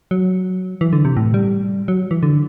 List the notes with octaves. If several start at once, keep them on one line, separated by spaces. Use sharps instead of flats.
F#3
E3
D3
C3
A2
G3
F#3
E3
D3